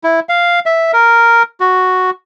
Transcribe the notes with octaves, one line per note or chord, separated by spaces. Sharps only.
E4
F5
E5
A#4
F#4